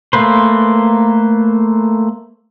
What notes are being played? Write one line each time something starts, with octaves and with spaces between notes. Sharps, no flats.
A3 A#3 B4 C5